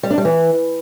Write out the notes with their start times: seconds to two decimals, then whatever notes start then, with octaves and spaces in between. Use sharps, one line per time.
0.03 G3
0.10 D4
0.18 G3
0.25 E3